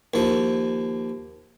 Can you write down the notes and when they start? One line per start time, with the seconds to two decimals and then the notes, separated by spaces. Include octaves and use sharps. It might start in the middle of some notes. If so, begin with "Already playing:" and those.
0.14 D#2 F3